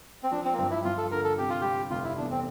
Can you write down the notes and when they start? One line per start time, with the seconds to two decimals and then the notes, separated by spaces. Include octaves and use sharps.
0.23 C4
0.31 F3 D4
0.45 C4
0.54 A#3
0.58 G2 C4
0.71 E4
0.84 G2 F4
0.98 A4
1.11 D3 A#4
1.24 A4
1.38 C3 G4
1.50 F4
1.61 G3 G4
1.90 F1 F4
2.04 E4
2.17 E2 D4
2.31 C4